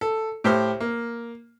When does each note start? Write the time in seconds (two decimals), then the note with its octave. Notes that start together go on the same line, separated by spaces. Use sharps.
0.01 A4
0.44 A2 G4 C5 F6
0.80 A#3